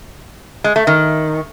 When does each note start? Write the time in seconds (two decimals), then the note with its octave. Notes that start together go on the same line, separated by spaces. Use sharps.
0.64 G#3
0.76 A3
0.87 D#3